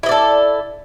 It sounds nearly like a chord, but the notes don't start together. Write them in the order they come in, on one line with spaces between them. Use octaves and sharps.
E4 D#5 D5 A4